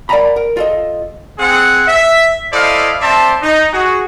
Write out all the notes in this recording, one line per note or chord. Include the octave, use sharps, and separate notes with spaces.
A#4 D5 F#5 G#5 A#5 B5
A#4
F4 A4 D#5
C4 G#4 F#5
E5
E4 A4 C5 D5 D#5 F5
C4 C5 D5 E5 A5
D#4
F#4 G#4